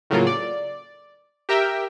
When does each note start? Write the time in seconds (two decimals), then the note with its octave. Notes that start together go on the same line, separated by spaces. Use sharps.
0.10 A2 C#3 F#3 A#3 F4
0.27 D5
1.49 G4 A#4 E5 G5